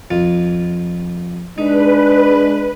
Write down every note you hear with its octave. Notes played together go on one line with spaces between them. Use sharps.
F2 F4
G#3 D4 D#4 B4